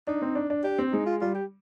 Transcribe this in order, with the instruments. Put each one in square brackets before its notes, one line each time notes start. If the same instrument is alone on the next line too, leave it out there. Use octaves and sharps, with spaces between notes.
[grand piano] D4 [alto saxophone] D#4
[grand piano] C4
D4
D4
[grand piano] D4 [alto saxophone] G4
[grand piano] C4
[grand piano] G#3 [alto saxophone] D#4
[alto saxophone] F4
[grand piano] G3 [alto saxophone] F4
[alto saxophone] G4